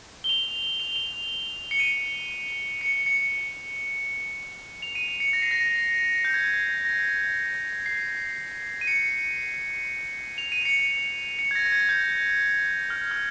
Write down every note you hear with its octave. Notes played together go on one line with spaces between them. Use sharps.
G7
F7
F7
G7
F7
C#7
D#7
C#7
C#7
F7
D#7
D#7
C#7
A#6
C7
A#6
G6
G#6
A#6
C7
D#7
C#7
F7
D#7
C#7
D#7
C#7
G#6
A#6
G#6
G6
F6
F6